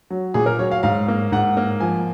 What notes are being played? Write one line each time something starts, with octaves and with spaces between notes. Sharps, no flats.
F#3
A#2 G#4
A#4
F#3 C#5
F5
G#2 F5
A#3
G#2 F#5
A#3
F3 G#5